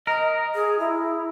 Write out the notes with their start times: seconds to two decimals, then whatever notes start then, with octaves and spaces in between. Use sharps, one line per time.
0.07 A#4 D#5
0.55 G#4
0.79 E4